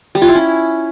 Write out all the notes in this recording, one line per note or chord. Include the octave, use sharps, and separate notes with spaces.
G3
F4
E4
C#4